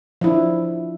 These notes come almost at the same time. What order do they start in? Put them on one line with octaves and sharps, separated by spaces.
F3 E4 D4